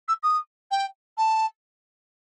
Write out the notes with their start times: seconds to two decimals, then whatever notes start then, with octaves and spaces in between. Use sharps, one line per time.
0.08 E6
0.23 D#6
0.71 G5
1.17 A5